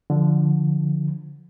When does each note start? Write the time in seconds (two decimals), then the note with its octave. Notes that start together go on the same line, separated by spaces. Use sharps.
0.10 D3 F3